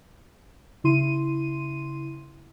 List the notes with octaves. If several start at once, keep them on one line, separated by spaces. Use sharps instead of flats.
C#3 E4 C6 D#7